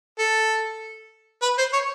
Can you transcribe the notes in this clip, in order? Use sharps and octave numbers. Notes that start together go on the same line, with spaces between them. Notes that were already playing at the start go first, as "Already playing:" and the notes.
A4
B4
C5
C#5